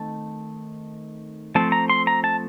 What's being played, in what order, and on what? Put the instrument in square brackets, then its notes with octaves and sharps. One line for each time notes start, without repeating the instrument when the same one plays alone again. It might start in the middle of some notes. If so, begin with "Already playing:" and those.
Already playing: [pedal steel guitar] D#3 A3 C4 A5
F3 A3 C4 A5
A#5
C6
A#5
A5